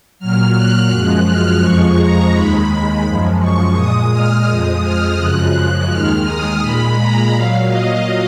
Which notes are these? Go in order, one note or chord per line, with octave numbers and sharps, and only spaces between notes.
A#2 F#3 F6
F#6
F#2 F3 G#3
F6
F2 F3 G#3 C#6
A#5
D#2 D#3 G#3 B5
F#2 F3 G#3
C#6
A#2 G#3 D#6
F6
F2 F3 G#3 D#6
F6
F#2 C#3 F3 G#3 F#6
F#6
D#2 D#3 G#3 F6
D#6
A#2 G#3 B5
A#5
A#2 F#3 F5
D#5